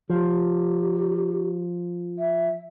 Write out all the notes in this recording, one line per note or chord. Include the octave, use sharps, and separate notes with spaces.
F3 G4
E5